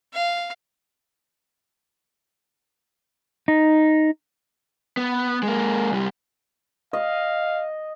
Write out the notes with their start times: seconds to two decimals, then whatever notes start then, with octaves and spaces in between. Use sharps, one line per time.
0.14 F5
3.48 D#4
4.97 B3
5.43 G#3 A#3
5.92 C2 G3
6.93 D#5 F5